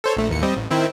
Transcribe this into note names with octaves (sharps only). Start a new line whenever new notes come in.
A4 C5 C#5
A#1 A3
A1 D#2 C#7
G3 C4 D#5
A1
D#3 C4 E4